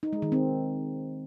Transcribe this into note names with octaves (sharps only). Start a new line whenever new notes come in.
D#4
G#3
D#3
C4